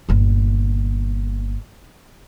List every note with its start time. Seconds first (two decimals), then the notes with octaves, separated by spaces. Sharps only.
0.09 G1 A#2